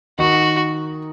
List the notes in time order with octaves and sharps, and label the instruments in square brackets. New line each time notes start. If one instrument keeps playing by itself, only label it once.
[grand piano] D#3 D#4 [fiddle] F#4